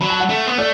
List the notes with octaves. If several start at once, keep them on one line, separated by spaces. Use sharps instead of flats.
F#3 B5
A5
F#5
A3
B3
A3 D5